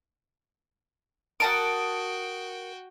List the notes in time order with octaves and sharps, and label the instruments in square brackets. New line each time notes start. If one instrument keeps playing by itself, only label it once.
[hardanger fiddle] F#4 G5 [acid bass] A#4 [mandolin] F#5 A5 D#6 [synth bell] D7